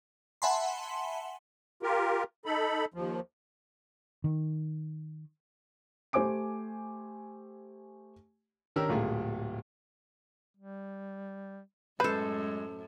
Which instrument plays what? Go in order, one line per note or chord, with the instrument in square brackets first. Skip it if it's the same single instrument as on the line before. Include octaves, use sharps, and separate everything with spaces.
[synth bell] E5 F#5 G#5 A5 B5 C6
[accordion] F4 G4 A#4
D#4 A4 B5
D#2 F3
[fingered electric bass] D#3
[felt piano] A3 G4 C5 G#5 D6 D7
[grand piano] D#3 C#4 D4 G4 A#4 E6
D1 A#2 G3 A3 G#4
[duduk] G3
[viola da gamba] F#2 A2 [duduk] G#3 [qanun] A4 C5 [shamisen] B4